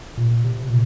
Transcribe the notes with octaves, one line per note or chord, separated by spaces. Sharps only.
A#2
C3
A#2